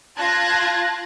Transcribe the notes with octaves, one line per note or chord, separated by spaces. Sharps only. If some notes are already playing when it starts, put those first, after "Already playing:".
F4 A5 F#6 G#6 A#6